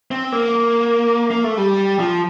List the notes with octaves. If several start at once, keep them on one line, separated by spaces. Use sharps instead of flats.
C4
A#3
A#3
A3
G3
F3